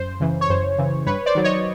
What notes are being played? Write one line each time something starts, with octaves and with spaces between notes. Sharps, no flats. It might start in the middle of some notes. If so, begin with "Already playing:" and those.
Already playing: F#2 C5
C#3 E3
C#5
F#2 C5
C#3 E3
G2 B4 C#5
C5 D5
D#3 F#3
C#5 D#5